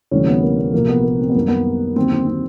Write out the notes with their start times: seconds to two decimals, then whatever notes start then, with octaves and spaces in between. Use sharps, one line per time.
0.11 D2 C3 E3 G3 C#4
0.28 B3
0.42 A#3
0.58 B3
0.73 C2 A#2 F3 A#3
0.89 B3
1.04 A#3
1.19 C4
1.29 B3
1.35 F#2 D#3 G3 A#3
1.48 B3
1.96 D#2 D3 F#3 C4
2.12 C4
2.27 C4